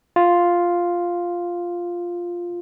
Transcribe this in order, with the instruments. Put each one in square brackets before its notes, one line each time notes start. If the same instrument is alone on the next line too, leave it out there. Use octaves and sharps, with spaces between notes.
[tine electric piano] F4